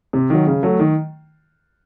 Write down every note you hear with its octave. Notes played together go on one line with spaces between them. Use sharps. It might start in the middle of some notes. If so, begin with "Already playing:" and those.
C3
D#3 F#3
C#3
F#3 A3
D#3